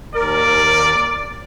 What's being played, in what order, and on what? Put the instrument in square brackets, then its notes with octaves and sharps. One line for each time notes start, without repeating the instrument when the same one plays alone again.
[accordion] D#2 A#4 [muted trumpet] D5